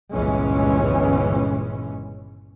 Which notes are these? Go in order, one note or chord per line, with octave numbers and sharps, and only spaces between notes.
G1 C#2 A#2 E3 G#3 C#4